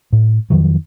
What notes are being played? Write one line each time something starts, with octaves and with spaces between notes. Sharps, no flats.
A2
F2 D#3 F3 F#3